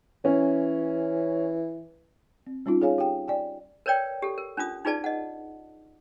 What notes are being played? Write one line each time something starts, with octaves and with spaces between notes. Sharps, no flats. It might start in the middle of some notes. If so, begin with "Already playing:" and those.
E3 C#4
C4
G3 C#4 D#4 F4
G#4 C#5 F5 G#5
G4 G5
D5 G5 G#5
A#4 B4 C#5 D5 G5
G4 A4
A#4
C#4 D4 F4 D#6
D#4 F4 G#4 B4 D5 A5
D#5 F#5